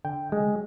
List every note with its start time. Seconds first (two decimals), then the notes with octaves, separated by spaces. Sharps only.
0.05 D3 G5
0.32 G#3